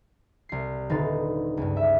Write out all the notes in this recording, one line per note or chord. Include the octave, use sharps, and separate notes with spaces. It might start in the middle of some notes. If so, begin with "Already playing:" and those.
C2 C7
D#1 D3 D#4 B4 C5 A6
C#2 G2
E5